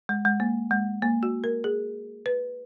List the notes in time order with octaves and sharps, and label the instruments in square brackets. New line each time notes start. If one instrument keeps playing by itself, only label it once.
[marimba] G#3
G#3
A#3
G#3
A#3
F#4
A#4
G#4
B4